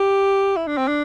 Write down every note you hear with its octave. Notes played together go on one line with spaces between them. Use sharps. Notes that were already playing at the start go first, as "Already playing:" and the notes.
Already playing: G4
E4
D4
C4
D4